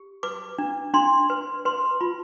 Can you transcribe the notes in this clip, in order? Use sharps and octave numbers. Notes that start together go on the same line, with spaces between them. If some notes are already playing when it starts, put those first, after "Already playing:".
Already playing: G4
B4 D6
D4
D4 C6
B4
B4 C6
F4 B5